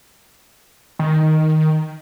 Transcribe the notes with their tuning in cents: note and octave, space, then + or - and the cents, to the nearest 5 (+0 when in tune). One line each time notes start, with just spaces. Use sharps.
D#3 +5